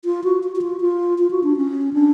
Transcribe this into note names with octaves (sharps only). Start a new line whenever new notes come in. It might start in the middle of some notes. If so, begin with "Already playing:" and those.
F4
F#4
F#4
F#4
F4
F4
F4
F#4
D4
C#4
D4